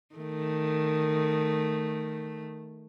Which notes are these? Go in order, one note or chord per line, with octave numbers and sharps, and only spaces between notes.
D#3 A3